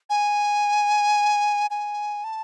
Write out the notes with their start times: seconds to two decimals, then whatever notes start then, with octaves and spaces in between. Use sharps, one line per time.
0.10 G#5
1.70 G#5
2.24 A5